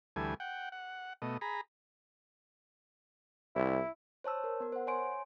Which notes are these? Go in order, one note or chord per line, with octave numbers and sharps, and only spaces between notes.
D2 E3 G3 A3 G#5
F#5 G5
F#5
B2 A3 D#5
G#4 A#5 B5
C2 E4
C5 C#5 A5 E6
A#4
B3 A#4
C5 F#5
C#5 G#5 C6 D7